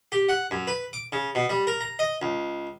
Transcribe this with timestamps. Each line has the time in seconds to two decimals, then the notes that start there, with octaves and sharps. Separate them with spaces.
0.12 G4
0.29 F#5
0.51 F#2
0.67 B4
0.93 D6
1.12 C#3
1.35 B2
1.49 G3
1.67 A#4
1.81 A#5
1.99 D#5
2.22 C#2